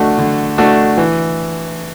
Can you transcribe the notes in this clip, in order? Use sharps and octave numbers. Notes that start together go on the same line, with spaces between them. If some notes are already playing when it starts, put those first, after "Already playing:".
Already playing: D3 A3 D4 F#4
D3
A3 D4 F#4
E3